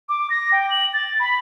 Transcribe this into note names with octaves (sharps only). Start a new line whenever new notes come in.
D6
A#6
G5
F#7
A6
B5